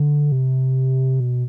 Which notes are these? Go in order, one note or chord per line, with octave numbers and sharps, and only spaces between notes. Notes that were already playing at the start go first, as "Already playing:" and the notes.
Already playing: D3
C3
B2